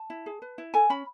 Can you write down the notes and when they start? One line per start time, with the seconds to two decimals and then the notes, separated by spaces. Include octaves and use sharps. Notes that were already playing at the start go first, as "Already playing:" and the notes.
Already playing: A5
0.10 E4
0.26 G#4
0.42 B4
0.58 E4
0.74 A4 G#5
0.90 C#4 B5